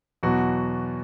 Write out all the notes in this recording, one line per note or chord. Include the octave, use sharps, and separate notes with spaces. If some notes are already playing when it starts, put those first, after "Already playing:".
E2 B2 F#3 F#4